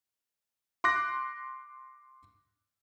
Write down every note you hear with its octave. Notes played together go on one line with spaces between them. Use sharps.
C6 D6 F#6 A#6